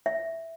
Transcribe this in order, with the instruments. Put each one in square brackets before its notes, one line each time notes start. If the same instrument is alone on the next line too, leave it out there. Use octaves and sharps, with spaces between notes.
[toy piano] E5